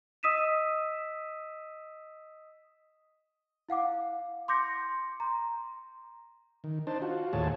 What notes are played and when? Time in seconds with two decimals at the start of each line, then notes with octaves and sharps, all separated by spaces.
0.23 D#5 D#6 E6 B6 D#7 E7
3.69 E4 F5 F#5 D6
4.48 C6 D6 G6 A#6 C#7
5.20 A#5 C6
6.64 D#3
6.87 D4 D#4 C5 A5
7.02 F4 F#4
7.33 D#2 A2 F4 G#4 C#5 A5